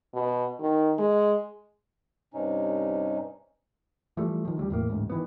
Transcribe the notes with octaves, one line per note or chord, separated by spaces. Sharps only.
B2
D#3
G#3
G2 C3 C#4 D#4
E3 F3 G3 A3
D#3 F3
D2 F#3 G3
E2 A2 A#3
A1 D2 G#2
D#3 E3 B3